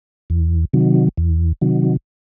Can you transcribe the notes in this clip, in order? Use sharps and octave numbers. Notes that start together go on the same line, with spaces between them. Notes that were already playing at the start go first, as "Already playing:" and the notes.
E2
C3 D#3 F#3
E2
C3 D#3 F#3